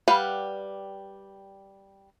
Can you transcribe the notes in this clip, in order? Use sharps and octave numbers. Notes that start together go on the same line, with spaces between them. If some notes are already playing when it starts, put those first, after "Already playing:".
G3 B4 F5 F#5